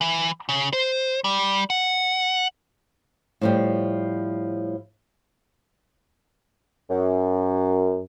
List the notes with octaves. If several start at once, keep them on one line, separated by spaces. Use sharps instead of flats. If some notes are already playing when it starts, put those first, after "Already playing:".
E3
C#3
C5
G3
F#5
A2 F3 G3
F#2